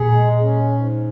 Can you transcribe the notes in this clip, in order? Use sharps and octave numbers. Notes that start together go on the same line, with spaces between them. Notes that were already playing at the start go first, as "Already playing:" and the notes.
Already playing: A#2 G#4
G#3
C#4
G#2